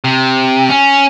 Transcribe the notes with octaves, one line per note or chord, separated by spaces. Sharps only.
C3
C#4